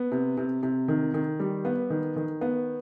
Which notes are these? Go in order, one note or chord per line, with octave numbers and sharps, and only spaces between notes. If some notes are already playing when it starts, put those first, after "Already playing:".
Already playing: B3
C3
C3
C3
D#3
D#3
G3
B3
D#3
D#3
B3